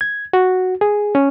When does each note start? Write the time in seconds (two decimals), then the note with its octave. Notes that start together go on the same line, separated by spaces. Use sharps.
0.01 G#6
0.33 F#4
0.81 G#4
1.15 C#4